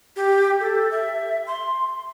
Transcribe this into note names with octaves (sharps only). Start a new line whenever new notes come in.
G4
A4
E5
C6